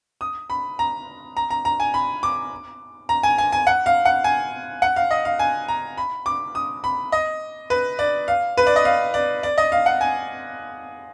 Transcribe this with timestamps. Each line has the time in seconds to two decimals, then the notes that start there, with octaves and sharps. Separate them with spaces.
0.21 D#6
0.50 B5
0.79 A#5
1.37 A#5
1.50 A#5
1.65 A#5
1.80 G#5
1.94 B5
2.23 D6
3.09 A#5
3.23 G#5
3.38 G#5
3.52 G#5
3.67 F#5
3.86 F5
4.05 F#5
4.24 G#5
4.82 F#5
4.96 F5
5.11 D#5
5.25 F5
5.39 G#5
5.68 A#5
5.97 B5
6.26 D6
6.55 D#6
6.84 B5
7.12 D#5
7.70 B4
7.99 D5
8.28 F5
8.58 B4
8.67 D5
8.76 D#5
8.85 F5
9.14 D5
9.43 D5
9.58 D#5
9.72 F5
9.86 F#5
10.01 G#5